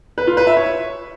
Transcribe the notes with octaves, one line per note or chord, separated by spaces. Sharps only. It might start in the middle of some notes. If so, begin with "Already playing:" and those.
B4
F4
B4
E5
C#5